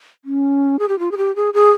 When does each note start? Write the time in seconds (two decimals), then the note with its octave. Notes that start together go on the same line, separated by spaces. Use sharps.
0.25 C#4
0.79 G#4
0.88 G4
0.99 F4
1.11 G#4
1.17 G4
1.36 G#4
1.54 G#4